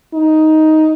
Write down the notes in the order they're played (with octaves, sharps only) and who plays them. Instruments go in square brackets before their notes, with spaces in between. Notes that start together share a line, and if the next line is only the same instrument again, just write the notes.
[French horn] D#4